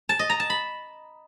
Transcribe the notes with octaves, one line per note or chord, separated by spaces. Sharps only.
A5
D#5
A#5
A5
B5